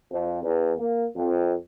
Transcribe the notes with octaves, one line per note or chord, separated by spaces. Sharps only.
F2
E2
A#3
F2